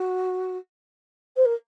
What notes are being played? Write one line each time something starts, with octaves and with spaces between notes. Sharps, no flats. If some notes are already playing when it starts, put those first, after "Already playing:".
Already playing: F#4
C5
A#4